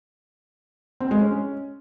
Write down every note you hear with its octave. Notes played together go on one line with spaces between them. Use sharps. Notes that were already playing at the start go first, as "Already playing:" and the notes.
C4
G#3
C#4